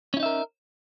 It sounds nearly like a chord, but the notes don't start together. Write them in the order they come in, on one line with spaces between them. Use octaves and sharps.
C#4 E4 D#4 E5 A#4